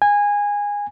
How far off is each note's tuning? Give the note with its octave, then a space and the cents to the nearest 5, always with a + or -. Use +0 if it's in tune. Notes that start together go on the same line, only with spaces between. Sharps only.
G#5 -20